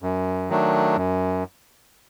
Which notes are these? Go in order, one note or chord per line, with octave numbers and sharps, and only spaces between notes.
F#2
D#3 F#3 A3 D4
F#2